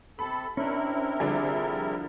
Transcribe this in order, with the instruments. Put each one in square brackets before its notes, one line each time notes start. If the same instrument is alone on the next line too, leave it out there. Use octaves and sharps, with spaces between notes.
[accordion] C3 A4 [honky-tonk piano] B5
[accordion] C3 E4 A#4 [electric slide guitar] C#4 D4
[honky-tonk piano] D3 F3 G3 [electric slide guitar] G#4 D5 G#5